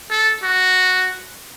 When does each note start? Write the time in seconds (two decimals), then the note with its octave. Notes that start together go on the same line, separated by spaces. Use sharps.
0.11 A4
0.43 F#4